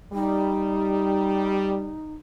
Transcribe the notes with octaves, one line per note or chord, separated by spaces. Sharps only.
G3 D#4